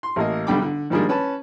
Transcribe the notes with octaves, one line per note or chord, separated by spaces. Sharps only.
C6
A1 A#3 D#5
B1 D3 G3 G5 D6
D3
D#3 F3 G3 G#3 A#3 D4
C#4 B4 A5